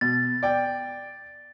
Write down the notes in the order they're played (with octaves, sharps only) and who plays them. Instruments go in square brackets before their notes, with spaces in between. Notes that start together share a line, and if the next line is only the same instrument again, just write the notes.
[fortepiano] B2 [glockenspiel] A6
[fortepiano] D5 G5